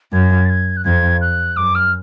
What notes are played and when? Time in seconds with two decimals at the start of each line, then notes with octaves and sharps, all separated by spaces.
0.13 F#2 G#6
0.45 A6
0.49 G#6
0.77 F#6
0.85 F2 G#6
1.21 F#6
1.57 F#2 D6
1.75 F6